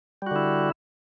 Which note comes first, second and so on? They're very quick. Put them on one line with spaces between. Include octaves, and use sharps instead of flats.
G3 F#4 D3 E4